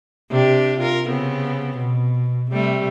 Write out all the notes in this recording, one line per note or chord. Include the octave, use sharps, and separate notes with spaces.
C3 D4 G4
F4 A#4
C#3 B3 C4
B2
C3 G3 A3